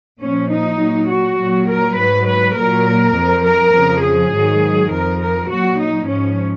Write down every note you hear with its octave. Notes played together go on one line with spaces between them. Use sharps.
A#2 F3 C#4
D#4
A#2 F#3
F#4
A#2 F#3
A#4
G#2 F#3 B4
B4
A#2 F#3 A#4
F2 F3
A#4
F2 C#3 F3
G#4
G#2 D#3 F#3
F2 F3 A#4
A#4
A#2 F#3 F#4
D#4
G#2 F3 C#4